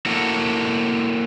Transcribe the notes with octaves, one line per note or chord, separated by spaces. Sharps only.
A#3 E4 F#4 A4